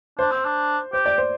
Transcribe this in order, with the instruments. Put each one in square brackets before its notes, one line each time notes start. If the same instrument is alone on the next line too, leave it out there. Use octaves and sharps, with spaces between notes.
[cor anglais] D4 [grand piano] C5
[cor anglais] C4
D4
[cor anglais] G4 [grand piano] C5
[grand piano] D5
C5